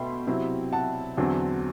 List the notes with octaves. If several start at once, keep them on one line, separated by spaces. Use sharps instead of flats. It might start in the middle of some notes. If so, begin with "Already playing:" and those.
Already playing: B2 A3 E5 G5 B5 C6
C3 F#3 C4 E4
F#5 A5
E2 D3 F#3 C4